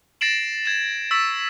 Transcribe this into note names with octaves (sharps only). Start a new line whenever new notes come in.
A6 A#6 C7 D7 E7 F#7
G#6 E7
C#6 E6 A6 B6 E7